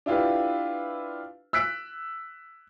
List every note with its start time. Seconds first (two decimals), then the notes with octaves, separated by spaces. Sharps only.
0.06 D4 E4 F4 G4 B4
1.53 E6 F#6 B6 D7